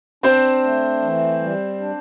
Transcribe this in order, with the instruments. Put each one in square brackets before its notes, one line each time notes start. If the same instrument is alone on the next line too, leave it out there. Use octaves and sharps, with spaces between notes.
[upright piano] C4 C5 [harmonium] D4
[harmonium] A3
E3
G3
D4